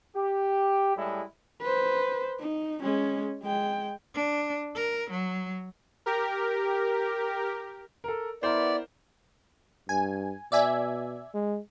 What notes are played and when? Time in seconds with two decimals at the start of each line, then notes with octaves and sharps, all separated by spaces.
0.16 G4
0.97 A2 G3 G#3 E4
1.62 B4 C5
2.40 D#4
2.83 G#3 C#4
3.43 G#3 G5
4.14 D4
4.75 A#4
5.10 F#3
6.06 G4 A#4
8.04 A4 A#4
8.43 B3 E4 A#4 C5 D5
9.89 G2 G#5
10.52 B2 D5 E5 G#5
11.34 G#3